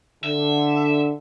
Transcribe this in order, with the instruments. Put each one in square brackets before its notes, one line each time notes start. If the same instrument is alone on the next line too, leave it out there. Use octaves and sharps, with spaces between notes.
[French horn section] D3 [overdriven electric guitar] E5